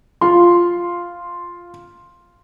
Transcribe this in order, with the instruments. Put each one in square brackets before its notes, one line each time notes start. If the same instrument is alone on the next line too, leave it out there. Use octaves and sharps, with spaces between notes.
[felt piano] F4 C6